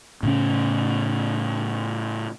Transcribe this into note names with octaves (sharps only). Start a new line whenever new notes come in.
A2 C#3 C#4